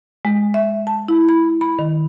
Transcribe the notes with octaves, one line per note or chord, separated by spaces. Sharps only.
G#3
E5
A5
E4
B5
B5
D#3